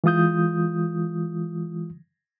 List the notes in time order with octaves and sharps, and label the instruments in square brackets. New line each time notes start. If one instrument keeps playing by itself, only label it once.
[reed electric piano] E3 G#3 F4 D#6 G6